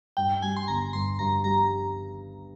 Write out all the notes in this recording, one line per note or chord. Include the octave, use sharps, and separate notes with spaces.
G2 G5
G3 G#5
C6
G1 A#5
G2 C6
G2 A#5
G3 A#5